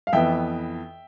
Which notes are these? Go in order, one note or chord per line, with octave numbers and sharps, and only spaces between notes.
F5
F2 E3 B3 E5 G5